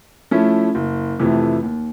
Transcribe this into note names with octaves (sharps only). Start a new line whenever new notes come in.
F3 A3 C#4 E4
F#1
F2 C3 E3 A3
D#2